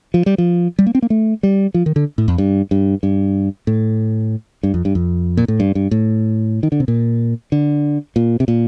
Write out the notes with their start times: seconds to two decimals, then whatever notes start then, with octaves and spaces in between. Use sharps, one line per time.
0.14 F3
0.26 G3
0.38 F3
0.79 G3
0.87 A#3
0.95 C4
1.02 A#3
1.10 A3
1.43 G3
1.74 F3
1.86 D#3
1.96 D3
2.18 A2
2.28 F2
2.38 G2
2.71 G2
3.03 G2
3.67 A2
4.63 G2
4.74 F2
4.85 G2
4.95 F2
5.37 A#2
5.48 A2
5.60 G2
5.75 G2
5.91 A2
6.63 D#3
6.72 D3
6.80 C3
6.88 A#2
7.52 D3
8.16 A#2
8.40 C3
8.48 A#2